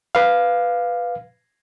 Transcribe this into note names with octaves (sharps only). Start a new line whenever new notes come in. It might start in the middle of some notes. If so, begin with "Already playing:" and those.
B4 F5